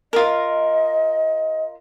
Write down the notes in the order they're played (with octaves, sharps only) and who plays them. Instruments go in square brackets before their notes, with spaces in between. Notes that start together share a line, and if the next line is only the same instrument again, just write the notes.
[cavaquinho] F4 A#4 [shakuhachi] D#5